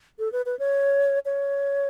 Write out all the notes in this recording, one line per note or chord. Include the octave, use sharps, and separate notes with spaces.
A4
B4
B4
C#5
C#5